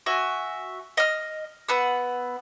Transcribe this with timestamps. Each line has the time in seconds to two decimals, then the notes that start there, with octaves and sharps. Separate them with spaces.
0.06 F#4 E5 G#5
0.97 D#5 F6
1.69 B3 F#5 E6